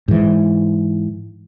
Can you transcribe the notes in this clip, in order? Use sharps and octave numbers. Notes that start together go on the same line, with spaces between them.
G#2 E3